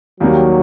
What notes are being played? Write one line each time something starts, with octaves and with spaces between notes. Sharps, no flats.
D#2 D#3 F#3 G3 A#3